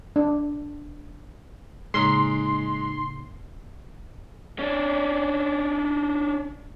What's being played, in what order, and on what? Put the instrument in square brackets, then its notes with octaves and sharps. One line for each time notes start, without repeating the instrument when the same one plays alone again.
[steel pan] D4
[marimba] A2 C#3 A#3 [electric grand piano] G#3 [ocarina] D#4 [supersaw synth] C6
[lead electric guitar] C#4 D4